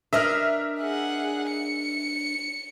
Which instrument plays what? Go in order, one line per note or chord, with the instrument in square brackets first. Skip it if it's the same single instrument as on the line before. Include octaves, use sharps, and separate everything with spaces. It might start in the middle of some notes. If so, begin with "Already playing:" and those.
[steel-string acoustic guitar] D4 A#4 D#5 [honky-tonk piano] E5 F6
[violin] G#4 F#5
C#7